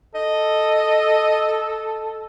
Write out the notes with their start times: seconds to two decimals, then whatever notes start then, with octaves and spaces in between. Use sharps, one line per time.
0.15 A4 D#5